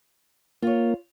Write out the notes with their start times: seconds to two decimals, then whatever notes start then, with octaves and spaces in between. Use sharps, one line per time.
0.63 A#3 F4 C#5